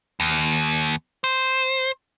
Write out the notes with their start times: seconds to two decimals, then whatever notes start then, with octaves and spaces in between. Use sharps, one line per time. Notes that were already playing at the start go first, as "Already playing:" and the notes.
0.20 D#2
1.24 C5